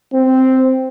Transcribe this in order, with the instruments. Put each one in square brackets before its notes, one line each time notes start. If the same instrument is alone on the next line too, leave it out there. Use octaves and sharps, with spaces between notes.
[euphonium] C4